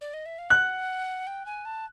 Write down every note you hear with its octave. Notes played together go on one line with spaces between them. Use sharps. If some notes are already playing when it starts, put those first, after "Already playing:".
D5
D#5
E5
F5
F#5 F#6
G5
G#5
A5